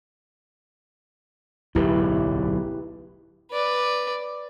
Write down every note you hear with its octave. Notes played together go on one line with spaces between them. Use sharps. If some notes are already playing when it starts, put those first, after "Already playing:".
D1 B1 G#2 E4 G4 B4
B4 D5